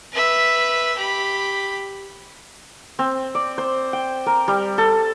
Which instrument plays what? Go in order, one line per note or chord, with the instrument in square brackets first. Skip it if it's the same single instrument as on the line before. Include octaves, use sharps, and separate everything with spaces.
[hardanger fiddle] B4 E5
G4 B5
[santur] C4
D5
C5
G5
A#4
G3
A4